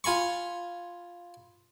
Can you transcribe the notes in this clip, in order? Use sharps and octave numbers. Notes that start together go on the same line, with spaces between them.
F4 G#5 B5 C#6